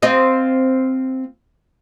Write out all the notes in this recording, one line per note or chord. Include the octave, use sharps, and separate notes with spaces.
C4 F4 D#5